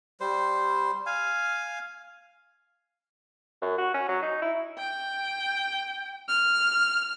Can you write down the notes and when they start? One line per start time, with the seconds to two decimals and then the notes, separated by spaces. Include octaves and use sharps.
0.20 G3 C5
1.06 F5 G#5
3.62 F#2
3.78 F#4
3.94 C#4
4.08 F#3
4.22 D#4
4.42 E4
4.78 G5
6.29 F6